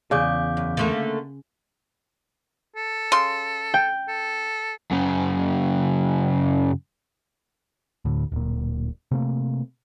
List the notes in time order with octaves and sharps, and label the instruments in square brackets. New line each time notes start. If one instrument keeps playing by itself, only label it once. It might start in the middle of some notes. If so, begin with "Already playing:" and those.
[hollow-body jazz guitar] E2 D5 [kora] C#3 [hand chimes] F5 D6 G6
[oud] F#2
D3 A3 A#3
[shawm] A4
[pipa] C#3 C6
[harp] G5
[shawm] A4
[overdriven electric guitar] F#2 C#3
[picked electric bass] D2 A2
D1 A#2
C3 A3 A#3